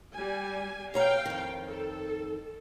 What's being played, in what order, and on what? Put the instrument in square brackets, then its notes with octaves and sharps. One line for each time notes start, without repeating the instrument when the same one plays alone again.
[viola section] G3 G#5
[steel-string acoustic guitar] B2 C#5 A#5 [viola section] F5 G5
[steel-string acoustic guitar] F2 D#3
[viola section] A4